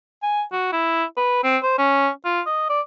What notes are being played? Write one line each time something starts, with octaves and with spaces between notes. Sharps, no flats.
G#5
F#4
E4
B4
C4
C5
C#4
F4
D#5
D5